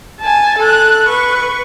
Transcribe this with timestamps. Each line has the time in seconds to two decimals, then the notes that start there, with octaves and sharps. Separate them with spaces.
0.21 G#5 A5
0.59 A4 F#6
1.09 B4 C#6